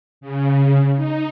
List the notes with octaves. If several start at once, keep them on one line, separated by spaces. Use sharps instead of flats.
C#3
D#4